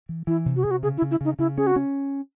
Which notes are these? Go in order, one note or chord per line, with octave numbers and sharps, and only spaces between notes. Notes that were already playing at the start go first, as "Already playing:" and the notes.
E3
E3 E4
C3
F#4
C3 G#4
F#4
C#3 G#4
E4
C#3
E4
C#3 D#4
C#3 E4
C#4 G#4
F#4
C#4